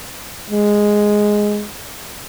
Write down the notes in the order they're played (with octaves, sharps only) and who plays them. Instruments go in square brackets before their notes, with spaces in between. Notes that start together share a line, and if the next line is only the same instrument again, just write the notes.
[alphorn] G#3